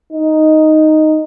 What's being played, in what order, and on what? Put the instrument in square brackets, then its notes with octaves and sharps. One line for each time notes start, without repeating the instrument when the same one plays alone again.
[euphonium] D#4